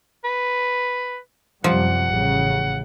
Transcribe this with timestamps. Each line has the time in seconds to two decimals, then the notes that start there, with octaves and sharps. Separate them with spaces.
0.24 B4
1.64 F#2 C3 F3 G3 F#5
2.10 A1 C#3